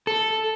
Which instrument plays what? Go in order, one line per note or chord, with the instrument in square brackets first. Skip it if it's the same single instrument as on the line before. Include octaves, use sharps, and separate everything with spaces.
[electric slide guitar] A4